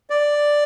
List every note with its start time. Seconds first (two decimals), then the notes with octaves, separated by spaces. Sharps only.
0.10 D5